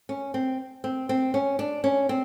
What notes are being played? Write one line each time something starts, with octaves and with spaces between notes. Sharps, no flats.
C#4
C4
C4
C4
C#4
D4
C#4
C4